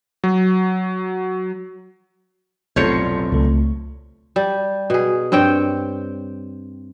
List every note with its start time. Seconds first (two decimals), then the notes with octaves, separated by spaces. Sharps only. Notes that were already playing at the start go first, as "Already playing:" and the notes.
0.24 F#3
2.76 F1 B1 A2 F4 A4 C5 C#5 C#7
3.32 C#2 A3
4.36 G3
4.90 B2 G#4
5.32 G2 C4 C#5 G5